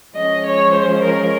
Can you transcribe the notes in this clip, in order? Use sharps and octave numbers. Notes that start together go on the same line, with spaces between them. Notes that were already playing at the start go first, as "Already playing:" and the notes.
F3 G#3 C#4 D#5
C#5
C5
A#4